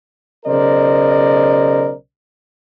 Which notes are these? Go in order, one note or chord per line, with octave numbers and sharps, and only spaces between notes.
B1 C#3 A#4 C5 D5 D#5